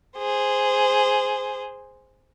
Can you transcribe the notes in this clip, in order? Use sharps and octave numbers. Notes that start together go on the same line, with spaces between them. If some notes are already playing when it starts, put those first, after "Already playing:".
G#4 C5